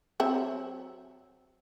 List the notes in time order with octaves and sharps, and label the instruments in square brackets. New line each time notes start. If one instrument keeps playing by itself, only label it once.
[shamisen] F#3 C4 E5